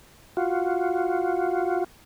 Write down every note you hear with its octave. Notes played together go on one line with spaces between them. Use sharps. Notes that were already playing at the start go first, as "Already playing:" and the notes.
F4 F#4